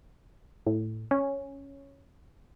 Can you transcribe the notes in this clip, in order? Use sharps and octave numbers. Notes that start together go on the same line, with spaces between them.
A2
C#4